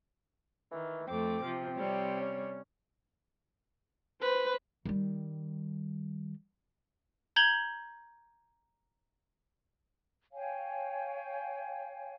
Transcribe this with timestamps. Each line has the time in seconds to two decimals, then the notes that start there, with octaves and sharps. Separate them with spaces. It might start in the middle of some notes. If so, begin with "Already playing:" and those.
0.71 D#3 E3
1.07 F2 A3 C4 D6
1.44 C3 F3
1.77 C3 G3 C#5
2.21 C#4
4.22 B4 C5
4.86 D#3 G3
7.36 A#5 G6 G#6 F#7 G7
10.32 C#5 F5 G5 G#5